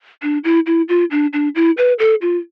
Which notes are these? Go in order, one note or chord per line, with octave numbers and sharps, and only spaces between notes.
D4
E4
E4
F4
D4
D4
E4
B4
A4
F4